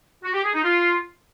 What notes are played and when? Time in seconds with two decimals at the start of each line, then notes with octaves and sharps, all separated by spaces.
0.23 F#4
0.33 G4
0.43 G#4
0.53 D#4
0.63 F4